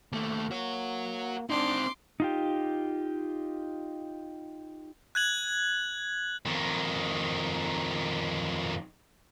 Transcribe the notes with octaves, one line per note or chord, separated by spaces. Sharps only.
D#2 A3
A#3 F#4 C#5
C4 D4 D#4 C6 D6
D#4 F4 G4
F#6 G#6 F#7
F2 D#3